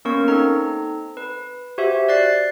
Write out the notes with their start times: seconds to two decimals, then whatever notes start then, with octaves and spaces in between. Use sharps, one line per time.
0.05 A#3 B3 C#4 A#4 C#6
0.28 C4 D#4 A4 A#5
1.17 B4
1.78 F#4 G4 C5 E5
2.08 D5 F#6 A6 C7